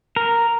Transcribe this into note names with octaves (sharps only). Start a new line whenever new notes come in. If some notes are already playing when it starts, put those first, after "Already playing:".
A#4